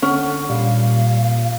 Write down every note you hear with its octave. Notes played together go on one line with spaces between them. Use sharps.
D3 C#4 F#5
A#2 G3 F5